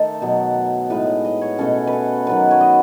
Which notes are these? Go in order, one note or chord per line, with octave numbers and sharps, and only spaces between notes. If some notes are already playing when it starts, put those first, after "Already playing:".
Already playing: D#3 A3 D#4 A4
B2 F#3 B3
A2 G#3 D#4 B4
B4
D#5
C#5
B2 A3 C#4 A4
B4
A4
D#3 F#3 B3 B4
C#5
D#5